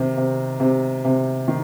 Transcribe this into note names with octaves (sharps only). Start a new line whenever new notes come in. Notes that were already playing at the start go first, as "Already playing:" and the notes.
Already playing: C3 D#3
C3
C3
C3
D#3